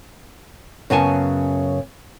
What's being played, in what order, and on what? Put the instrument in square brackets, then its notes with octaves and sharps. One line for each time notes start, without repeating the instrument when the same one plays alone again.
[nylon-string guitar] F#2 C#3 B3 G#5 A5